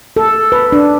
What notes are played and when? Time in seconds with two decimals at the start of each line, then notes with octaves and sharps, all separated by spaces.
0.16 A4
0.52 B4
0.72 D4